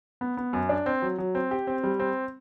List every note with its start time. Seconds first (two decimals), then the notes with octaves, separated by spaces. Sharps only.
0.21 B3
0.37 B3
0.53 F#2
0.69 D4
0.86 C4
1.02 F#3
1.18 F#3
1.35 C4
1.51 G4
1.67 C4
1.83 G3
2.00 C4